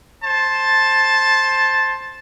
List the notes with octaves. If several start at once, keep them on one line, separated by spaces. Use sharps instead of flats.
C5 A5